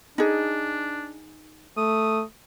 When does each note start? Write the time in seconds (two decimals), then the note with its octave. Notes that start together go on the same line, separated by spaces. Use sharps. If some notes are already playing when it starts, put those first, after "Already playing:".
0.18 D4 D#4 G#4
1.77 A3 D#6